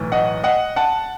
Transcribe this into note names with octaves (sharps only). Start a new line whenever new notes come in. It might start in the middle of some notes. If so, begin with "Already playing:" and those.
Already playing: B1 A2 E3
D#5 F#5
D#5 F#5
F#5 A5